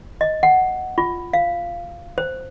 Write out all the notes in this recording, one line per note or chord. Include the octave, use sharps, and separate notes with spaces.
D#5
F#5
F4
F5
C5